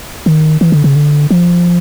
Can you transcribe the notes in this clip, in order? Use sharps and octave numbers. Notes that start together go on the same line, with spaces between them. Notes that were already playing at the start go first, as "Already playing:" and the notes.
D#3
E3
D3
C#3
D3
F3